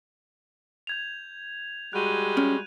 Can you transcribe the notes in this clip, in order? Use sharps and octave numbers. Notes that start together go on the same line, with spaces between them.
G6 G#6 F7
G3 G#3 F#4 F#6 D#7
C#4